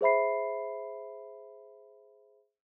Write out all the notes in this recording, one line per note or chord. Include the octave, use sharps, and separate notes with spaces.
G#4 C5 E5 B5 C7